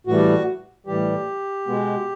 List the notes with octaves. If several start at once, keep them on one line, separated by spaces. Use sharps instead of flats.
A2 E3 G3 F#4
A2 E3 G3 G4
B2 G#3 B3